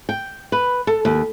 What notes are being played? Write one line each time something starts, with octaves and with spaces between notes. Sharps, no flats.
G5
B4
A4
D#2